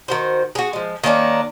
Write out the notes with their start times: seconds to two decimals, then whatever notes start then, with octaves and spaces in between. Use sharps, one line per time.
0.08 D#3 F#4 C5
0.55 F#4 G#4
0.73 F3 G#3
1.04 D#3 A#3 C#4 D4